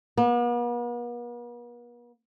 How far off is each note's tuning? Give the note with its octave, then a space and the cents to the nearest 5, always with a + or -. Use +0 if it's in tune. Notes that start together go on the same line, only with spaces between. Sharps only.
B3 -45